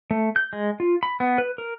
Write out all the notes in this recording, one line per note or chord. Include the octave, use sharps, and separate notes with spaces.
A3
G6
G#3
F4
B5
B3
B4
A#4